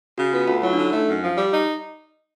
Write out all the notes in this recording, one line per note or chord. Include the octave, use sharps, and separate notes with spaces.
C#3 F#4
B3 F4
D2 F4
F#3 E4
D4
D3 D#4
A3
F#2
F3
G3
D#4